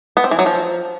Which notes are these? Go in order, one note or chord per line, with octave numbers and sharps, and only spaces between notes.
B3
C4
E3
F#3
F3